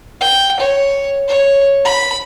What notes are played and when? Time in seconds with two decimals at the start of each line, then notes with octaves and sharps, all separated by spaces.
0.21 G5
0.60 C#5
1.28 C#5
1.85 B5